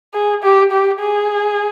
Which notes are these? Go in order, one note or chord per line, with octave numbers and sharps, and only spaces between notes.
G#4
G4
G4
G#4